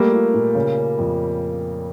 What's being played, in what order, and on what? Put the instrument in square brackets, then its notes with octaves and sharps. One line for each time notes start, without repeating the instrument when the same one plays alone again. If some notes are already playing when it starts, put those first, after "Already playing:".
Already playing: [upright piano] G3 A#3 [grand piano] A3
[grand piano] F4
A#2
C#3
C#4
F2